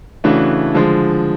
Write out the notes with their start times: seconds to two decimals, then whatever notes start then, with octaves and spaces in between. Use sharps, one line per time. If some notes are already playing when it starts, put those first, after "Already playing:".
0.24 C#3 E3 A3 D4 F#4
0.74 D3 F3 G#3